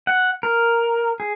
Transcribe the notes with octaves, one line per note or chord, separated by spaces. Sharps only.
F#5
A#4
G#4